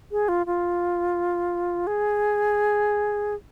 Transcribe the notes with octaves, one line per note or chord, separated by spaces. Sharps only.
G#4
F4
F4
G#4